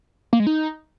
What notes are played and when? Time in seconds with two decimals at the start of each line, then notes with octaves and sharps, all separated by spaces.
0.33 A#3
0.40 G#3
0.47 D#4